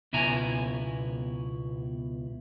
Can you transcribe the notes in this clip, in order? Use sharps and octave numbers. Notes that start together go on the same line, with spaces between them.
C#2 B2 E4 G#5 A#5